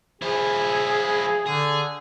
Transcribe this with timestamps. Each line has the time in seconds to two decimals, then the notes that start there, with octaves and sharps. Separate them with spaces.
0.22 F3 E4 G#4
1.47 D3 G#4